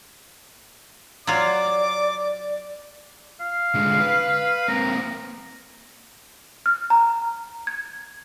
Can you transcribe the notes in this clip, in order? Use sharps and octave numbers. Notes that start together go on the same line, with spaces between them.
F#3 F4 D5 D6
F5
D3 G#3
B4
A#3 C4 A#5
F6
A#5
G#6